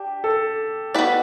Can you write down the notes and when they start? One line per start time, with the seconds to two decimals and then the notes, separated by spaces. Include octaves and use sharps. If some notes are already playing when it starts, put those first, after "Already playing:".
Already playing: D4 G4
0.24 A4
0.94 B3 F#4 B4 D5